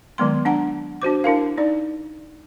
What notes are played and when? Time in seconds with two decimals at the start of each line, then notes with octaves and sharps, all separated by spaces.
0.18 D#3 F#3 G#3 B3 C6
0.45 D4 F#5 A#5
1.02 D4 F#4 C5 D6
1.24 D4 E4 A#4 F5
1.58 D#4 D5